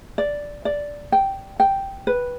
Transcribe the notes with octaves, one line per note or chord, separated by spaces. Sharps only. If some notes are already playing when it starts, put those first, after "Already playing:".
D5
D5
G5
G5
B4